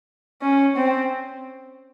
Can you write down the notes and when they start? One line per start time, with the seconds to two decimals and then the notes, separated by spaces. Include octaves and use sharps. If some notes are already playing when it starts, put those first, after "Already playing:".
0.42 C#4
0.76 C4